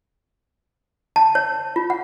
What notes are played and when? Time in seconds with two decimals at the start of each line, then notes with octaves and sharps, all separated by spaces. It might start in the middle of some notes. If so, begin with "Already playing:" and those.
1.16 A5
1.35 C#5
1.76 F4
1.90 F#5